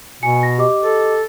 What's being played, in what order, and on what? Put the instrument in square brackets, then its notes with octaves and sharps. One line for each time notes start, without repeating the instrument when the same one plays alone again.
[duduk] B2 [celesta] G#5 C#7
[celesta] A#6
G4 D#5 D6
[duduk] A4